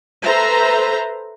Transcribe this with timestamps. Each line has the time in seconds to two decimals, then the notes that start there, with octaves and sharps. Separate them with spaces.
0.23 A4 B4 C5 E5 A#5